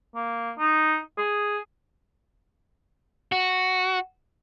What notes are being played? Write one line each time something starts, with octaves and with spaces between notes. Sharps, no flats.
A#3
D#4
G#4
F#4